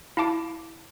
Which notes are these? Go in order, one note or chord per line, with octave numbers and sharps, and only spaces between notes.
E4 F5 A5 D6 D7